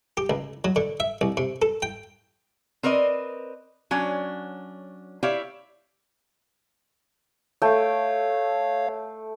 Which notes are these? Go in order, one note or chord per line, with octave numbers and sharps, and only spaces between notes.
G4
C#2
F#3
D3
E5
C2
C3
A4
G5
C4 A#4 B4 D5 D#5
F#3 C#4 D4
E4 G4 C#5 D5 E5 F5
A3 C#5 F5 G5